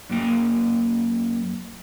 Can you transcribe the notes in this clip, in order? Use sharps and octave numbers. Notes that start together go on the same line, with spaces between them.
F#2 A#3 G5